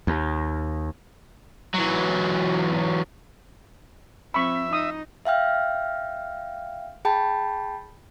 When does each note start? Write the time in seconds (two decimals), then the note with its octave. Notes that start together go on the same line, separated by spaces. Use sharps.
0.07 D#2
1.74 E3 F#3
4.34 F3 C4 E5 B5 C#6
4.73 D#4 D#6
5.25 E5 F5 G5 F6
7.05 G#4 G5 A5 B5